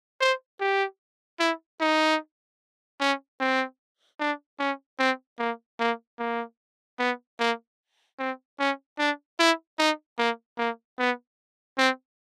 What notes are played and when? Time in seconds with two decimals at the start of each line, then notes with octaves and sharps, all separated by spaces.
0.21 C5
0.60 G4
1.39 E4
1.80 D#4
3.00 C#4
3.40 C4
4.20 D4
4.59 C#4
4.99 C4
5.39 A#3
5.80 A#3
6.19 A#3
6.99 B3
7.40 A#3
8.19 C4
8.59 C#4
8.98 D4
9.39 E4
9.79 D#4
10.18 A#3
10.58 A#3
10.99 B3
11.78 C4